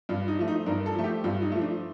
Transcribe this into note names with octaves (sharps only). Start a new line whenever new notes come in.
G2 F4
D#4
F3 A3
D#4
G2 A#4
A4
F3 A3
G4
G2 F4
D#4
F3 A3
D4